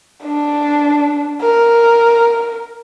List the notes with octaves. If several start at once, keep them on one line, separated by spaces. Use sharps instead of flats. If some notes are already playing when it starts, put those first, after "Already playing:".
D4
A#4